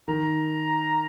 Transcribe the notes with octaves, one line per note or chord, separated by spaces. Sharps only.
D#3 A#5